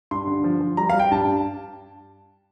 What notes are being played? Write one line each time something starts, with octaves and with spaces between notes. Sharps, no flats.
G2 C6
D3
F3
F3
G3 A#5
G3 F5
G5
G2 A5